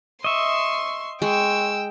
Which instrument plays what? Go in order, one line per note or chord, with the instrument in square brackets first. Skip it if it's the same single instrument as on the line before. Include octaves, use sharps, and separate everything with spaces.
[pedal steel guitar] D#5 E5 [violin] C6 [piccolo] C#6
[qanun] G#3 [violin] G5 E6 [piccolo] C#6